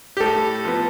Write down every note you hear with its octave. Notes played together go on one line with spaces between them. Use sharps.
G4
A2 A4
F3 B3